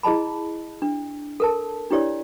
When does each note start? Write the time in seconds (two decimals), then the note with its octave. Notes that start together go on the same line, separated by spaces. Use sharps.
0.03 E4 G#4 D#5 A5 B5
0.82 D4
1.40 A4 A#4 A5
1.90 D4 E4 G4 C#5 D5